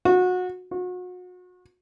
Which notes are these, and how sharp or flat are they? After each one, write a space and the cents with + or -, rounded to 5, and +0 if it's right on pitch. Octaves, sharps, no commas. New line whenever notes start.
F#4 -25
F#4 -35